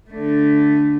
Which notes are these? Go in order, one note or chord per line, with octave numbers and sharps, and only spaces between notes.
D3 A3